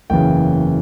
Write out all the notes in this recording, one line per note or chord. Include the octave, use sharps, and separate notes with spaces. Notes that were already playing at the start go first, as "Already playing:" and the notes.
F#1 E2 C#3 E3 G5